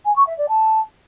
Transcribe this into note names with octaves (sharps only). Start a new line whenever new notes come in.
G#5
C#6
E5
D5
A5